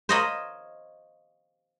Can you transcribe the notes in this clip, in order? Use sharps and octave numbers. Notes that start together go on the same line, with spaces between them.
C5 C#5 D#5 F5 A#5 B5